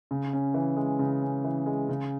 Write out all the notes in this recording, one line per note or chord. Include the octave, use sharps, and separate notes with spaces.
C#3
C#4
E3
G#3
C#3
C#4
E3
G#3
C#3